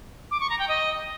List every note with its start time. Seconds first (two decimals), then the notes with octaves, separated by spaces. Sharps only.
0.31 D6
0.40 C#6
0.50 A#5
0.59 G5
0.68 D#5